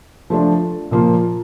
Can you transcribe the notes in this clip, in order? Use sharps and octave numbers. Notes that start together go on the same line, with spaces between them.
F3 A3 D4
A#2 F3 A#3 F4